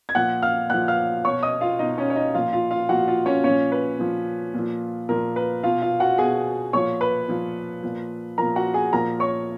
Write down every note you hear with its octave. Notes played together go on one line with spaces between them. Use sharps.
G#6
A#2 F3 F#5 F#6
F5 F6
A#2 F3 F#5 F#6
F5 F6
B2 C#5 C#6
D#5 D#6
F4 F5
B2 D#4 D#5
C#4 C#5
C#5
D#4 D#5
A#2 F3 F4 F5
F4 F5
F4 F5
A#2 F3 F#4 F#5
F4 F5
C#4 C#5
A#2 F3 C#4 C#5
B4
A#2 F3
A#2 F3
A#2 F3 A#4
B4
B2 F4 F5
F4 F5
F#4 F#5
B2 G#4 G#5
A#2 F3 C#5 C#6
B4 B5
A#2 F3
A#2 F3
A#2 F3 A#4 A#5
F#4 F#5
G#4 G#5
A#2 F3 A#4 A#5
C#5 C#6